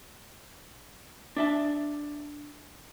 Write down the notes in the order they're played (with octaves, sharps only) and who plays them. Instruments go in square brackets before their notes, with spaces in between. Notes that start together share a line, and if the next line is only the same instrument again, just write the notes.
[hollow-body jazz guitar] D4 E5 A5